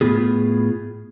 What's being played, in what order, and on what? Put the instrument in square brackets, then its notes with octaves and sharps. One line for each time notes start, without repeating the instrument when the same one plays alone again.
[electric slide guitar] A2 B3 F4 G#4